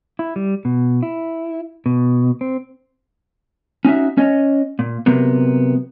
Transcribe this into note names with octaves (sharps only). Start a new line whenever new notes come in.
E4
G3
B2
E4
B2
C4
C#4 D#4 F#4 E5
C#4 C#5 D#5
A#2
C3 F#3 A#3 B3